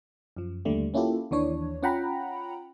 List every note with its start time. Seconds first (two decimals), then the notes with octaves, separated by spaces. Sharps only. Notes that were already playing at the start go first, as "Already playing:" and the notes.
0.37 F#2 F3
0.65 D#2 D3 G3 A3
0.94 A#3 C#4 E4 F4 G4 A4
1.31 D#2 E3 D4 C#5
1.83 C#4 F4 F#5 G5 A#5 B5